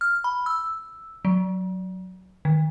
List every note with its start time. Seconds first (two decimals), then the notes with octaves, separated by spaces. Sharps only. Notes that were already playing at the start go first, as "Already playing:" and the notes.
0.01 F6
0.24 B5
0.46 E6
1.25 F#3
2.45 D#3